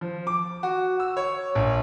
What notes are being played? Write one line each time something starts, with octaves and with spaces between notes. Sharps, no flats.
F3
D6
F#4
E6
C#5
A#1